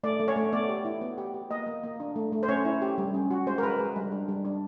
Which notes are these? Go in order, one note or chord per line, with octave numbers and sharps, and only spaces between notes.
A3 D5
A3
C#5
A3
B3 D5
G4
E4
B3
G4
G4
A#3 D#5
A#3
A#3
D4
A3
A3
C5
C#4 C#5
E4
G4
G3
C#4
F#4
G#3 C5
A#4
G#3 B4
G#3
G3
D4
G3
D4